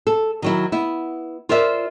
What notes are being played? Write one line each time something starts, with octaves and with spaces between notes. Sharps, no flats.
A4
D#3 F#3 E4
B3 E4
F4 A#4 C5 D5 E5